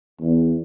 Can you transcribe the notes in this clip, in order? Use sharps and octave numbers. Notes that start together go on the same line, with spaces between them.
E2